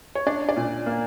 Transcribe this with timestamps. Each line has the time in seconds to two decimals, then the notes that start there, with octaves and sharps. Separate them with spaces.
0.15 C#5
0.27 D4 D5
0.49 D5
0.57 A#2
0.86 A#3